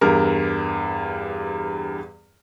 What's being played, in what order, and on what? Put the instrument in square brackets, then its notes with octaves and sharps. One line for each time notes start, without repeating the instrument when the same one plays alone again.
[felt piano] E2 G2 A#4